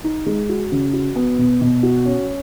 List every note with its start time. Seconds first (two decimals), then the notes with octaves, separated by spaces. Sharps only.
0.04 D#4
0.26 G#3
0.49 F#4
0.72 C#3
0.93 F#4
1.16 B3
1.38 B2
1.61 B2
1.83 F#4
2.05 C#4